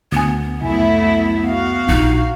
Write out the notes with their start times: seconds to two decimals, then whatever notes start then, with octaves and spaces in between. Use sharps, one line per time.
0.12 D2 B3 G#5
0.62 C2 F2 F#3 A3 E4
1.46 F#4 F5
1.88 A#1 D#4 F4